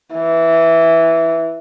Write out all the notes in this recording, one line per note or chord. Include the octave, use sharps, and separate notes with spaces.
E3